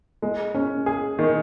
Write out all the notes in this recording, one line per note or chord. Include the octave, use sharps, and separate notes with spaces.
G#3
C#4
G#4
D#3